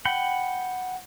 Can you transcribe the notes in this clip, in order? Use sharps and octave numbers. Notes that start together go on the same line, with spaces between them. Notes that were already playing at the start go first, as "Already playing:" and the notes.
F#5 G5 B5